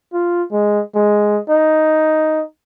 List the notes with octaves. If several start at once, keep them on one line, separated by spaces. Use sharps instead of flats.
F4
G#3
G#3
D#4